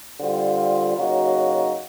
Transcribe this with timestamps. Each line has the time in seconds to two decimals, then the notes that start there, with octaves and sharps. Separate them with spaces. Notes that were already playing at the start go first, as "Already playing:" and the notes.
0.20 D3 G3 C4 F4
0.97 C#3 F#3 A#3 D#4 F#4